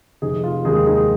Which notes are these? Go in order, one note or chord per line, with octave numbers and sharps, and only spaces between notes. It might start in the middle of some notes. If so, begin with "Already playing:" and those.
F1 D#4 G#4
F4
D#2 D#3 G#3 D#4 G#4
D#4 G#4